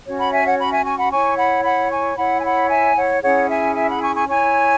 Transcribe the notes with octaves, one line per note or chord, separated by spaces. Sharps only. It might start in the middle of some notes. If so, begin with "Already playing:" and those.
C#4 F#4 C#5
F#5 B5
E5 G#5
C#5 F#5
F#5 B5
E5 G#5
G#5 C#6
F#5 B5
E4 C#5 G#5 C#6
F#5 B5
F#5 B5
G#5 C#6
E4 C#5 F#5 B5
G#5
F#5 B5
E5 G#5
C#5 F#5
C#4 E4 G#4 C#5 F#5
E5 G#5
E5 G#5
F#5 B5
G#5 C#6
G#5 C#6
E4 C#5 G#5 C#6